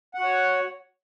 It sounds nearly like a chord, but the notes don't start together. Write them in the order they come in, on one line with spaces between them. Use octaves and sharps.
F#5 F#4 C#5